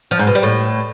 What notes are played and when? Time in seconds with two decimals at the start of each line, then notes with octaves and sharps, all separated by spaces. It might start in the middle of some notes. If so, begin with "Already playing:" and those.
0.11 F3
0.19 G#2
0.27 B2
0.35 G3
0.43 A2